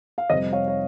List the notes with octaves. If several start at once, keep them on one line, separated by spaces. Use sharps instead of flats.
F5
F2 C3 G3 C5 D#5
C#5 F5
C#5